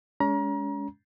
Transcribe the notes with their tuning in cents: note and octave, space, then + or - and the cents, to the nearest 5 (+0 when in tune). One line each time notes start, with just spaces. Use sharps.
G#3 +0 C#4 +35 A#5 +35